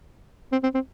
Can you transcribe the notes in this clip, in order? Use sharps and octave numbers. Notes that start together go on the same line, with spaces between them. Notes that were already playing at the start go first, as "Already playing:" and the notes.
C4
C4
C4